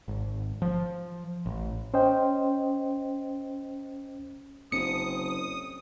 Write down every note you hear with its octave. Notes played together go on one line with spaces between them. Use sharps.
G#1
F3
A1
C#4 C5 D#5 G5
F#1 C4 D4 D#6 C#7